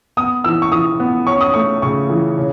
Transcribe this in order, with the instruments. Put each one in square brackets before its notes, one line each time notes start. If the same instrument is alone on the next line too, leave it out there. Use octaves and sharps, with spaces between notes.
[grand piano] B3 D#6
E3 E6
C#6
E3 D#6
B3
C#4 C#6
D#6
A3 C#6
C#3 C#6
E3
C#3